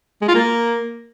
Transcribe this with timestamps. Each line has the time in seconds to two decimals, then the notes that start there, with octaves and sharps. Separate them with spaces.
0.22 G#3
0.28 F4
0.35 A#3